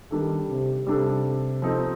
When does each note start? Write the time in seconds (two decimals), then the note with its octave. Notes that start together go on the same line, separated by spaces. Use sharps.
0.11 D#3 G3 D4 A4
0.48 C3
0.86 C3 G3 D4 A4
1.62 F3 C4 D#4 A4